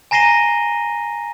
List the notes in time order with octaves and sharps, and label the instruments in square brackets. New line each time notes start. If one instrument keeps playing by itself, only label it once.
[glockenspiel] G#5 A#5 A#6 C7 D#7 G7